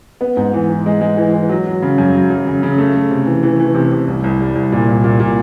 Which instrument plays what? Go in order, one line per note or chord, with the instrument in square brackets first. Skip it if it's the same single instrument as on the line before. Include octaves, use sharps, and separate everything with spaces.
[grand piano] B3
G#2
E3
E3
G#3
G#3
E3
E3
F#3
F#3
C#3
F#2
F#3
F#2
C#3
C#3
A3
A3
C3
E3
E3
E3
C3
C3
C2
C2
G3
C2
A#2
C2
A#2
A#2